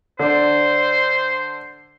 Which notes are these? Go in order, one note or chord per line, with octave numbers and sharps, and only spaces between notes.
D3 D4 C5